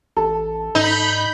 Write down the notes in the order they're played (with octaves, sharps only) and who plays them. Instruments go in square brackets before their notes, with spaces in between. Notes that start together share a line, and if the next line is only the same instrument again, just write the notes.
[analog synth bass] A1 [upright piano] A4
[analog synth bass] G#2 [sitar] D#4 [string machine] B5 G6